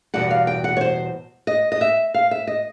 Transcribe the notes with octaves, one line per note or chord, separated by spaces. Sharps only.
E2 B2 G3 F#5
F5
G5
F#5
C#5
C5
D#5
D#5
E5
F5
E5
D#5